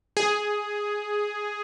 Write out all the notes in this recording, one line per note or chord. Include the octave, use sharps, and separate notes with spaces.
G#4